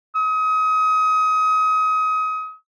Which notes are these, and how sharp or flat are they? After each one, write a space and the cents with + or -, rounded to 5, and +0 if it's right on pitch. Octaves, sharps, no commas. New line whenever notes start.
D#6 +30